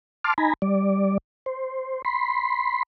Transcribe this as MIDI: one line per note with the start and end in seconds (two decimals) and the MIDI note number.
0.24 0.34 81
0.24 0.34 84
0.24 0.34 86
0.24 0.34 89
0.38 0.54 63
0.38 0.54 80
0.38 0.54 82
0.38 0.54 83
0.62 1.18 55
0.62 1.18 74
1.46 2.02 72
2.05 2.83 83
2.05 2.83 84